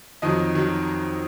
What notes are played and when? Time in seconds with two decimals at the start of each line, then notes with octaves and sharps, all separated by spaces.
0.22 F2 D#3 F#3 D#5
0.55 D#3 F#3